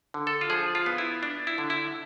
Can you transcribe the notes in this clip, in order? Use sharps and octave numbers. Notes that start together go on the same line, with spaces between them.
D3
A4
F4
F3 G#4
F4
B3
E4
D4
E4
D3
E4